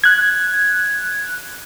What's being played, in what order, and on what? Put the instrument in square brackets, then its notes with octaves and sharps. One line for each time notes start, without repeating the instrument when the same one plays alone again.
[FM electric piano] F#6 G#6